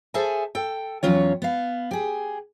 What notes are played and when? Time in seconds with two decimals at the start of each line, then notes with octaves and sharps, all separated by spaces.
0.14 G#4 A4 C5 E5 G#5 A5
0.55 A4 G5
1.03 E2 F#3 C#4 F4 C#5
1.42 B3 F5
1.91 G4 G#4